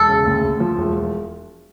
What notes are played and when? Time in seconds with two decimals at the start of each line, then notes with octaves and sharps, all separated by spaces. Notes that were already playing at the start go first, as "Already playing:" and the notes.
Already playing: E1 A4
0.09 C#3
0.26 D2
0.43 D2
0.60 F3
0.78 E1